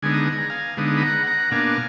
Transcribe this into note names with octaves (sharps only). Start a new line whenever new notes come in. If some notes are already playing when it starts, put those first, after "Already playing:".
D3 G#3 B3 D#4 G#5
A#5
G#5
A#5
F5 G#5
D3 G#3 B3 D#4
B5
F#5 A#5
F#5 A#5
B2 A#3 D4 F5 G#5